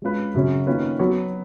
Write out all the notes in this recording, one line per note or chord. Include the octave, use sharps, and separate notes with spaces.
G#3 C#4 F4 B4
F#2 C#3 F#3 C#4
D#3 A#3 C#4 F4 B4
F#3 B3 F#4 C#5